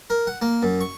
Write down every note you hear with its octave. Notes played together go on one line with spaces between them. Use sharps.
A#4
F#5
A#3
F#2
C#6